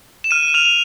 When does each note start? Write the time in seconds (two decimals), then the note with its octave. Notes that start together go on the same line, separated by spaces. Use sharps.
0.24 E7
0.31 F6 D#7
0.43 D#7
0.48 E7
0.54 F6 F7
0.65 F7